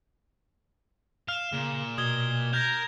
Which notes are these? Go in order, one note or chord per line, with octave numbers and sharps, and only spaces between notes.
F5 F6 E7
A#2 C#3
B2 D#6 G#6 G7
A#4 G6 G#6 A#6